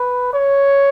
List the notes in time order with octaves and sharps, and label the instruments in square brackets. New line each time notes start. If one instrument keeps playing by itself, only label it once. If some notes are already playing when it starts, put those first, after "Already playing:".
Already playing: [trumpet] B4
C#5